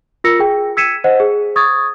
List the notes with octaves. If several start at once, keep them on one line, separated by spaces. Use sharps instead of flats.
F4 A#4 E6 A#6 C#7
G#4 G5
E6 G#6 B6 C#7 D#7 E7
C5 D#5 F#5
G#4
C#6 D#6 G#6 A6